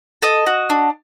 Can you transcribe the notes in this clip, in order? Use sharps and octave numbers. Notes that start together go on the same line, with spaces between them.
A4 D#5
F#4
D4